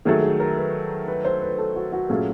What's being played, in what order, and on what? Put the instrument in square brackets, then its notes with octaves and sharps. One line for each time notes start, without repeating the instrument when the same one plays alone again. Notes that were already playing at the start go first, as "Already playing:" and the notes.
[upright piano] D#3 F#3 A3 [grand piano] G#4
[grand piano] G#4
A#4
B4
B4
C5
B4
A4
F#4
F#4
[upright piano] A#2 F#3 A3 C#4 [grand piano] G#4